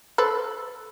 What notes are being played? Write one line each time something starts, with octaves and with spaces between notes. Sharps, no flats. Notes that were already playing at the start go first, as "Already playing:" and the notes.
A4 B4 C5